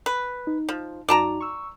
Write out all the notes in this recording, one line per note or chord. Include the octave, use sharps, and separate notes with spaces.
B4
D#4
F3
F#2 D#4 F#4 D5 A5 A#5
C#6 E6